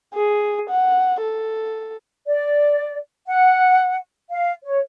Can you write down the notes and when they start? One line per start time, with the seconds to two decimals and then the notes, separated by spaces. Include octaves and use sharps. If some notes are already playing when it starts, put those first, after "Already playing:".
0.14 G#4
0.70 F#5
1.21 A4
2.27 D5
3.26 F#5
4.30 F5
4.63 C#5